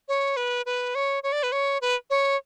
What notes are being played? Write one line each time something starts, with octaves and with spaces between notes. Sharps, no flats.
C#5
B4
B4
C#5
C#5
D5
B4
C#5
B4
C#5